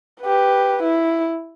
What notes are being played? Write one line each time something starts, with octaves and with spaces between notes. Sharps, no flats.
G4 B4
E4